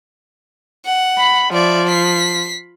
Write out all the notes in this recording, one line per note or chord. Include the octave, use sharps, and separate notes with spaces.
F#5
B5
F3 D5 E5
B6 C7